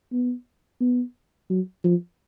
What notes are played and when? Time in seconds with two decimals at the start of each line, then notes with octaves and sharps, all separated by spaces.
0.12 B3
0.81 B3
1.50 F#3
1.84 F3